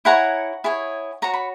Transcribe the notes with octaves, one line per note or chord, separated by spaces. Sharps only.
E4 G#4 C#5 F#5 A#5
E4 G#4 C#5
F#4 C#5 A#5
B5